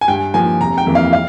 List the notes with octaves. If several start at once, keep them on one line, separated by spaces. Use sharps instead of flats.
G#5
G2 G5
F3 A#3 G#5
F1 A#5
G5
F2 E3 A#3
F5
F5